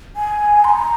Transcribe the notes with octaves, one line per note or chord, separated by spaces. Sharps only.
G#5
C6
A#5